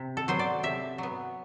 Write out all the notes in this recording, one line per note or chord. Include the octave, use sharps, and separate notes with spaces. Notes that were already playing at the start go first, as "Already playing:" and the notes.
Already playing: C3
A4
F#3 B3 C5
D5
C3 E5
F#3 B3